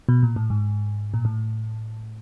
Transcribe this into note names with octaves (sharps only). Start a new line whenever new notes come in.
B2
A#2
A2
G#2
A#2
A2